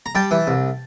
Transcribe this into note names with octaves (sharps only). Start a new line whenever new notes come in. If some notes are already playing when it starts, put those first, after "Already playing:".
A#5
G3 G5 A5
E3
C2